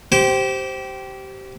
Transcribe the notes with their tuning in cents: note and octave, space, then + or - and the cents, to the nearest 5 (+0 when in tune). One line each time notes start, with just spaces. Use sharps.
G4 -20 C5 +0